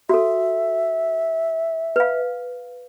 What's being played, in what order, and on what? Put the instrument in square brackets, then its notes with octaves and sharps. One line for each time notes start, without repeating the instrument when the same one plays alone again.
[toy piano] F#4 A4 [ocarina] E5
[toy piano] B4 F5